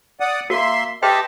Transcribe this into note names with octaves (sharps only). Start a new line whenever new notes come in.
D5 F#5 D#6
A#3 F#4 A#4 E5 C6
G4 B4 D#5 E5 G5 A5 C6